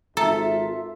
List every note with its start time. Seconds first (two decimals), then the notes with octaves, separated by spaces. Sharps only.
0.17 G#1 F4 A4 E5 A#5